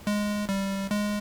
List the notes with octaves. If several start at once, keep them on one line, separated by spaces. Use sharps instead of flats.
G#3
G3
G#3